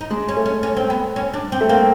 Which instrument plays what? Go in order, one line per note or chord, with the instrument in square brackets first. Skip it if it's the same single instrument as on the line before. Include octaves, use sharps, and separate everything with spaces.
[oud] D#4
[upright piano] G#3 [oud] D4
[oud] C#4
[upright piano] A3
[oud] C#4
C#4
C4
B3
C#4
D4
C4
[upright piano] A3
[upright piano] A#3 [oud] C4